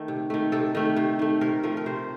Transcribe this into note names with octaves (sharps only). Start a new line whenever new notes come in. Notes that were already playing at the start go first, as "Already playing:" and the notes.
Already playing: D#3 A3
C3
D#3 A3
C3 A4
D#3 A3
C3
D#3 A3
C3 A#4
F3 A3 A#4
A#4
C3 C5